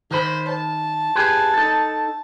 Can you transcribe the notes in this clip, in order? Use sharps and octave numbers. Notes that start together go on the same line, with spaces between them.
D#3 C5 B5
A5
G4 G#4 B4
D#4 A4